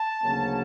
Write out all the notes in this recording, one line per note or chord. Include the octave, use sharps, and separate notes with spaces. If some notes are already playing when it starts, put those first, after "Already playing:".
Already playing: A5
D2 C#3 F#3 A#3 C#4